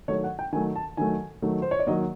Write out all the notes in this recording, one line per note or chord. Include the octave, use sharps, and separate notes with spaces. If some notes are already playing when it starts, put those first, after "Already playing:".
D#3 F#3 A3 C#5
F#5
G5
D#3 F#3 A3 G#5
A5
D#3 F#3 A3 G#5
D#3 F#3 A3
C5
C#5
D5
D#3 F#3 A#3 D#5